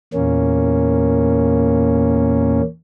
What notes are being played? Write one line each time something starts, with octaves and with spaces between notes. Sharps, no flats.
E2 A#2 A#3 C#4